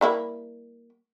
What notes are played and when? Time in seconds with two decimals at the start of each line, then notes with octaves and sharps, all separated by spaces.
0.01 G3 A#3 E4